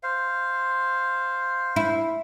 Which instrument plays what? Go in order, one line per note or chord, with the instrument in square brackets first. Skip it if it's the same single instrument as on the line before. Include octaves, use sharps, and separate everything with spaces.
[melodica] C5 F5
[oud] E4